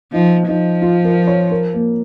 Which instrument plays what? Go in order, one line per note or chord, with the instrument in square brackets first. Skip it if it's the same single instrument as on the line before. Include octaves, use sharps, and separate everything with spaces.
[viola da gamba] F3 [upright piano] D#4
[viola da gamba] F3 [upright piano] D#4
[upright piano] F4
A#4
C#5
A#4
A#3